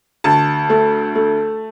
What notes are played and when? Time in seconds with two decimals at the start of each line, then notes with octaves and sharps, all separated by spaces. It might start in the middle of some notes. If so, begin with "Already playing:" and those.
0.24 D2 A5
0.70 A3
1.15 A3